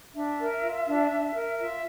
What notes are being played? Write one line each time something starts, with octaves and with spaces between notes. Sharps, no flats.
D4 E5
A#4
F4
D4
D4
A#4
F4 E5